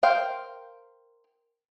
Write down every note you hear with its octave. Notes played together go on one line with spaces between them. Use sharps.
A#4 C5 F5 G5